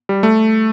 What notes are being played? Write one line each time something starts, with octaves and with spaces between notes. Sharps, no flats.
G3
A3